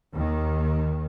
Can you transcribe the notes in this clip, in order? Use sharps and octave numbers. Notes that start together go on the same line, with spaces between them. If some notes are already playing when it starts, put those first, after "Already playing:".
D#2 D#3